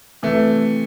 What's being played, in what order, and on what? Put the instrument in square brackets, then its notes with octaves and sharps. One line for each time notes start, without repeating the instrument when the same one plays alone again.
[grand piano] C3 E3 A3